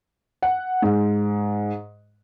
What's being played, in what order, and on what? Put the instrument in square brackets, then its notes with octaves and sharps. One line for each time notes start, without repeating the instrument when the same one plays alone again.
[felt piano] F#5
G#2